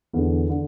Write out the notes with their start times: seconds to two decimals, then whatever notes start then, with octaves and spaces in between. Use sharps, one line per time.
0.13 E2 D3
0.50 D3